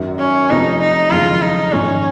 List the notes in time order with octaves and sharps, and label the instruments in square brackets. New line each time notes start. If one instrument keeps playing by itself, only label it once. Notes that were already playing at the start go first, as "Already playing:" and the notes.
Already playing: [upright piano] G#1 F#2 D#3 F#3
[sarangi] C#4
[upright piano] F1 F2 C3 F3 [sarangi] D#4
[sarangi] D#4
[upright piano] F#1 F2 D#3 G#3 [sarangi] F4
[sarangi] D#4
[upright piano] A#1 G#2 D#3 G#3 [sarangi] C#4